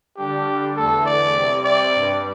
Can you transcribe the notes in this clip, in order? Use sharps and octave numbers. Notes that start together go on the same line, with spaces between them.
D3 G3 D4 G4
E2 D3 A3 A4
D5
C3 G3 C4
D5
G2 G3 D4